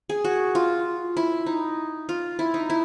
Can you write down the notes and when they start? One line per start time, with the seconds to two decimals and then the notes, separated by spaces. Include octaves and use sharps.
0.09 G#4
0.24 F#4
0.55 F4
1.17 E4
1.46 D#4
2.09 F4
2.39 E4
2.54 D#4
2.70 E4